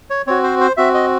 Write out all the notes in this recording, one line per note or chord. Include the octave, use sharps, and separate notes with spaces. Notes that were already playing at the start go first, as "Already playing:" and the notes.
C#5
C4 F#4 C#5
C5
C5
C4 F#4 E5
D#5